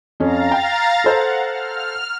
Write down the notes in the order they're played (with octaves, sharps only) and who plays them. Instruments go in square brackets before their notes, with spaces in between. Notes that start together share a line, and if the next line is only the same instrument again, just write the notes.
[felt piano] F2 C#4 [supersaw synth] F5 A#5 A6
[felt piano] G5
[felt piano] A4 C5 [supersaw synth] F#5
[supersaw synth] F6